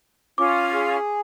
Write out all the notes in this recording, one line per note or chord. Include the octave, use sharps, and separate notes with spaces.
C#4 F4 D6
G#4